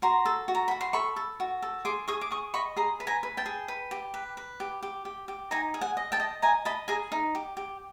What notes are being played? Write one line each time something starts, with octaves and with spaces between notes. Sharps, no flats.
F#4 A#5 C6
A4
F#4
A#5
F#4 B5
C6
A4 B5 C#6
A4
F#4
A4
G#4 C6 D6
G#4 C#6 D#6
D6
G#4 C#6 D#6
D#5 B5 C#6
G#4 A#5 C6
B4
G#5 A#5
B4
G5 A5
G#4
B4
G4
B4
B4
G4
G4
G4
G4
D#4 G#5 A#5
G#4
F#5 G#5
D#5
G5 A5
D#5
D#5 G#5 A#5
D#5 A5 B5
G#4 G#5 A#5
D#4
G4
G4